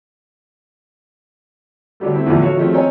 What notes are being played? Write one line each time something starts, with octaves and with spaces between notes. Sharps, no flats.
D3 F#3 G3 A3
A3 C4 E4
E2 A2 D3 E3 F3
F#4 A4 C#5 F5
D#3 F3 F#3 G#3 A3 C4
C4 C#4 C#5 D#5 G#5 A#5